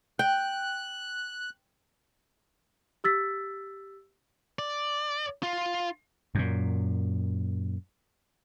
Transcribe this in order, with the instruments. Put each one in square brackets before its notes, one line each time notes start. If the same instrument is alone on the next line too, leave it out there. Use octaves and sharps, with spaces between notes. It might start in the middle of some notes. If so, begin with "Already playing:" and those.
[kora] G5 [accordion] F#6
[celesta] G4 E6 A6 B6
[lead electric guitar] D5
F4
[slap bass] F#2 A#2